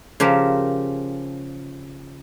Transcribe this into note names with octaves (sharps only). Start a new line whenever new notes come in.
C#3 F3 G4 A#4